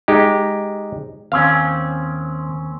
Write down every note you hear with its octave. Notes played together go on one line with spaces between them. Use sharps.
G#3 D#4 G4
D#2 C4 C#4 F5